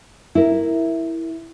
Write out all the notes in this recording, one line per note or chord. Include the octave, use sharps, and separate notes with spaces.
E4 A#4